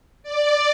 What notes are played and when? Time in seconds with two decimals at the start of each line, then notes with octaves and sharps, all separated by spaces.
0.23 D5